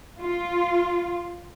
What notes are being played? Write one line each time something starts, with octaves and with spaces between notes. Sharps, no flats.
F4